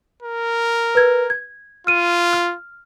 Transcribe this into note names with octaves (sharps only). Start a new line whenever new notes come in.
A#4
B4 G#6
G#6
F4 F6 D#7
F6